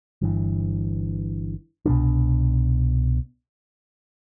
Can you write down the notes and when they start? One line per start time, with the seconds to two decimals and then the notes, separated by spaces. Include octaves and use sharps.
0.22 G1 G2 E3
1.86 C2 B2 G3 D4